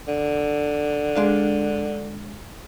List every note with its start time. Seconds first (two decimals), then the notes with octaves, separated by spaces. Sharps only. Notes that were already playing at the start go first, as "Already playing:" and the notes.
0.08 D3
1.16 G#3 D4 F5